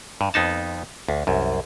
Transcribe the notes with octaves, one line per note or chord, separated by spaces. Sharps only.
G2
F2 B3 D#4 A5
D2
C2 F#2